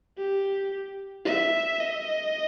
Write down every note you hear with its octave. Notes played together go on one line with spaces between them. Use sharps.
G4
E5
D#5